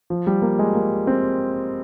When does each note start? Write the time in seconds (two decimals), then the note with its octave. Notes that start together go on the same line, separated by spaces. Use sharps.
0.10 F3
0.27 G3
0.42 A#3
0.59 G#3
0.75 A#3
1.07 C4